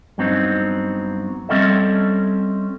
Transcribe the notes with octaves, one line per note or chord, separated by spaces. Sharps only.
G2 F#3 B3 C4 D#4
G3 C4 C#4 A4 D#5 E5